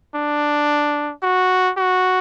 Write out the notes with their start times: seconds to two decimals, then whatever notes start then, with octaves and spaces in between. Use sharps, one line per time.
0.15 D4
1.23 F#4
1.77 F#4